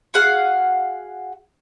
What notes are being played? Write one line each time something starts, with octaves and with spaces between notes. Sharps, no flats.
F#4 G#4 F5 F#5